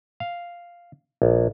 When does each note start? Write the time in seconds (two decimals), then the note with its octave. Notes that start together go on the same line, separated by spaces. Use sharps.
0.20 F5
1.22 A#1